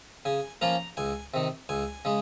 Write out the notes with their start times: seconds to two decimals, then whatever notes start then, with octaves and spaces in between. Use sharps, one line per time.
0.25 C#3 G#5
0.61 F3 A#3 C#4 F4 A#5
0.97 C#2 G#5
1.34 C3 D#3
1.69 C#2 G#5
2.05 C#3 G#3